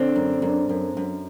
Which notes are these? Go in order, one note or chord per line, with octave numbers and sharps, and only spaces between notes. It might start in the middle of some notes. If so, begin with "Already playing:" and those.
Already playing: D3 C4 D4
F#2
F#2
F#2
F#2